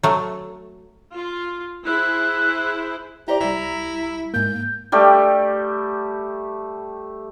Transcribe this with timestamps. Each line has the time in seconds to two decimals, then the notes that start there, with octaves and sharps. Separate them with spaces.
0.03 F#3 A3
1.13 F4
1.86 E4 G#4 C5 F#6
3.28 E4 G4 C5 D5 A#5
3.40 C2 G3 E4
4.34 G#2 A#3 G6
4.92 G3 A3 G4